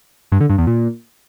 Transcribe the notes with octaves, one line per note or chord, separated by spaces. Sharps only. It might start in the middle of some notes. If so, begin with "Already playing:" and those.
G2
D3
G2
E2
A#2